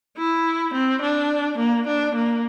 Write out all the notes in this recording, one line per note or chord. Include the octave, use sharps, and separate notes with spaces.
E4
C4
D4
A#3
D4
A#3